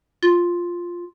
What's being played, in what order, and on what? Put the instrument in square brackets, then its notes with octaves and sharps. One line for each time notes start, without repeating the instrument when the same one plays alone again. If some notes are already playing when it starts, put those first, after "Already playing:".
[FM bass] F4